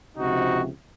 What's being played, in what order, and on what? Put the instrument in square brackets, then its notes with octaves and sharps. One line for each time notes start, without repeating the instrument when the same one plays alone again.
[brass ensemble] C#2 C3 F3 D#4 F#4